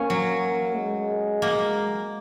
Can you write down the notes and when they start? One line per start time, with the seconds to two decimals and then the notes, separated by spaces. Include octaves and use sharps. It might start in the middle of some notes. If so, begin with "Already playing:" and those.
Already playing: A#3 C#4
0.10 F#3
0.77 G#3
1.42 A#3